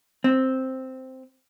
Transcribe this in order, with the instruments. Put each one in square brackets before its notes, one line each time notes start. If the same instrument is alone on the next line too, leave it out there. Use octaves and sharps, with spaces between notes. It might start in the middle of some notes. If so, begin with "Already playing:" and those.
[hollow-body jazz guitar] C4